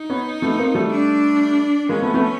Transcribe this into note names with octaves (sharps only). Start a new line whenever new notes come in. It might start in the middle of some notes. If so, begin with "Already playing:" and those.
Already playing: D#4
B3 C#4
A3 B3
A#3 C4
G3 A3
D4
G#3 A#3 C#4
A3 B3
A3 B3